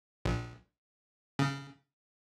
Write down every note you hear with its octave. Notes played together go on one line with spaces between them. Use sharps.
A#1
C#3